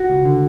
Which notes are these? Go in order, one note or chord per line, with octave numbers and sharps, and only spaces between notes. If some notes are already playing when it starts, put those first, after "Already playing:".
Already playing: F#4
C#2
D3